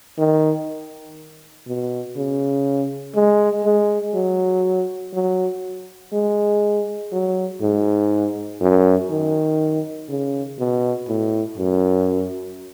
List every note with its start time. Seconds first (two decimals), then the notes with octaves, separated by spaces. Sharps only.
0.18 D#3
1.67 B2
2.16 C#3
3.15 G#3
3.64 G#3
4.14 F#3
5.13 F#3
6.13 G#3
7.12 F#3
7.61 G#2
8.61 F#2
9.10 D#3
10.09 C#3
10.59 B2
11.08 A2
11.58 F#2